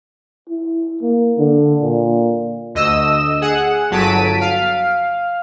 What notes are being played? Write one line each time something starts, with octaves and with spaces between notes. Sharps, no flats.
E4
A#3
D3
A#2
D2 D#5 E6 E7
G#4 F#5
G1 F#3 A5 B6 D7 D#7
F5